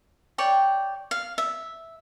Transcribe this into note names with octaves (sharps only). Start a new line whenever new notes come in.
C#5 D5 G5
F5
E5